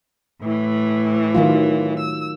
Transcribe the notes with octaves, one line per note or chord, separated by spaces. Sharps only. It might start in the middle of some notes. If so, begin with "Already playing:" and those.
A2 E3
D#3 F#3 F4
E6